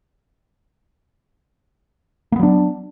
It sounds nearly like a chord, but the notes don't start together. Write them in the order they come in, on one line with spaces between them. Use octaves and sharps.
A#3 B3 F#3 D4